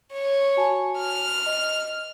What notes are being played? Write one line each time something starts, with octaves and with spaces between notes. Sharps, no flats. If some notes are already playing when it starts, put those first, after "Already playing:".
C#5
F#4 G#5 A5
F6
D#5